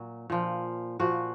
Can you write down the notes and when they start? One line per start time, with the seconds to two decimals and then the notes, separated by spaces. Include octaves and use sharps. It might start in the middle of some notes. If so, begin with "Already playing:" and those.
Already playing: A#2 F#3
0.30 A#2 F3
0.99 A#2 F3 F#4